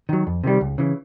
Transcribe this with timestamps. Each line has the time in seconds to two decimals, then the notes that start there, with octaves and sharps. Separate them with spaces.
0.09 D#3 F#3
0.27 F2
0.44 C3 D#3 G3
0.61 C#2
0.78 C#3 E3